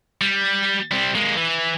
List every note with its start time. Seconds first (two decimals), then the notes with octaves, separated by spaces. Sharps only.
0.21 G3
0.91 G3 C4
1.15 G#3 A#3
1.37 E3